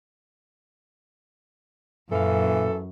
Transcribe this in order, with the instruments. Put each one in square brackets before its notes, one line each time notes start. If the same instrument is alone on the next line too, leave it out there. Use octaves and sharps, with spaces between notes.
[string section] F#2 [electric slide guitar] A#2 F5 [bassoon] E3 [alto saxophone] A4